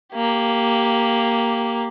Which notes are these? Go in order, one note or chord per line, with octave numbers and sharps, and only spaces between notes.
A#3 G4